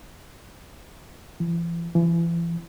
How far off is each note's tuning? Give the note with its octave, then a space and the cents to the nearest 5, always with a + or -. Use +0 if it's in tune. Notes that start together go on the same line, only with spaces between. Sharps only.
E3 +45
E3 +40